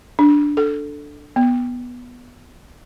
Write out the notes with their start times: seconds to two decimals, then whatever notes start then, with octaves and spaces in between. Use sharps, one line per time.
0.19 D4
0.57 A4
1.36 B3